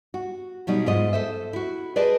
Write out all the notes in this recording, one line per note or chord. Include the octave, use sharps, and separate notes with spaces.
F#4
B2 F#3 G3 D#4
G#2 F4 D#5
A4 C5 E5
E4 F#4
G#4 B4 C5 D5 D#5 A5